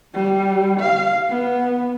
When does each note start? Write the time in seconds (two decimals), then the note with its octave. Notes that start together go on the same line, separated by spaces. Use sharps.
0.14 G3
0.80 F5
1.29 B3